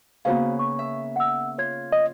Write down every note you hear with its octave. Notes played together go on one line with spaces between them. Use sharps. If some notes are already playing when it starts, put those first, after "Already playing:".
C#3 A#3 B3 F#4 C5 F5
C#6
E5
F#5 E6
F4 C#5 G#6
D#5